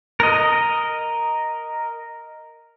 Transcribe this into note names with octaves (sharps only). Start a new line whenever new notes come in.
A#4 D#5